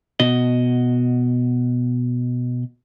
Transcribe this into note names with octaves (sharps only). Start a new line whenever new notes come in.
B2 F#4 D#5